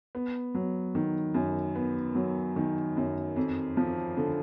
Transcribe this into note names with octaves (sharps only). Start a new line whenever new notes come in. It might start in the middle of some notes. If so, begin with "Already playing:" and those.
B3
F#3
D#3
F#2
B3
F#3
D#3
F#2
F2
F3
D3